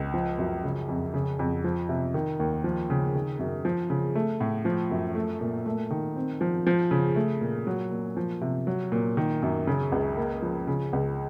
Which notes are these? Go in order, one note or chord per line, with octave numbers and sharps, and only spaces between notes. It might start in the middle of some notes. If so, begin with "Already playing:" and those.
Already playing: C#2
F3
F#2
C#3
F2
C#3
F2
F3
C3
D#3
D#2
F3
C#3
D#3
F#2
F3
C#3
A3
A2
F3
F#2
A3
A#2
A3
D#3
C4
F3
F3
C#3
A3
A#2
F#3
A#2
F3
C3
F#3
A#2
D#3
F#2
C#3
C#2
A#3
F3
C#3
C#2